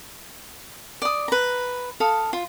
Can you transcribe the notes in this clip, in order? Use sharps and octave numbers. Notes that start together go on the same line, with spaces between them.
D5 D#6
B4 A#5
A4 F5 D#6
F4